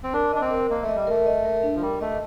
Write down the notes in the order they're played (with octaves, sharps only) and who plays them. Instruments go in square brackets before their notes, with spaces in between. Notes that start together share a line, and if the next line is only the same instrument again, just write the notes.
[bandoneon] C4
[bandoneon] D4 [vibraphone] A#4
[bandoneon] D4 [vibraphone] D#5
[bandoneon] C4
[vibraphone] A#4
[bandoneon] A#3 [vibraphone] D#5
[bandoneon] A3
[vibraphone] D#5
[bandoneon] G3
[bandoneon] A3 [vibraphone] A#4
[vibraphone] D#5
A#4
D4
[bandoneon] F3
[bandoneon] G3 [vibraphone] A#4
[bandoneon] A3 [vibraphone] D#5